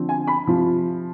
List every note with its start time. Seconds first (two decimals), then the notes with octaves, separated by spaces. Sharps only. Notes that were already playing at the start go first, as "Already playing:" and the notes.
Already playing: D3 F3 C4
0.09 G#5
0.27 B5
0.47 C3 F3